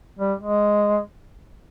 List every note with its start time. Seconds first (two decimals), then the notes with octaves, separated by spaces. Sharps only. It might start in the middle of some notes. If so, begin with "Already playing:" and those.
0.19 G3
0.40 G#3